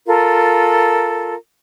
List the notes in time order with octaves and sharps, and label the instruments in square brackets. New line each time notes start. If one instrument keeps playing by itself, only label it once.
[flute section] F4 A4 A#4